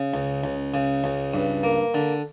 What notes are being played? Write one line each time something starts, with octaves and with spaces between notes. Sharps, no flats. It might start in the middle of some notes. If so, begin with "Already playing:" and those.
Already playing: C#3
C#2
C#2
C#3
C#2
G2
A#3
D3